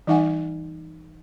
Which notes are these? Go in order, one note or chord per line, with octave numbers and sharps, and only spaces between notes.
E3 G3 D#4 E5 F#5 G#5